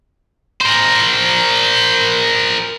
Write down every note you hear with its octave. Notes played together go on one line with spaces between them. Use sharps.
A#4 C5